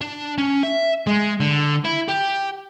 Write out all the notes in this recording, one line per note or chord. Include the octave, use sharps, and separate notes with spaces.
D4
C#4
E5
G#3
D3
E4
G4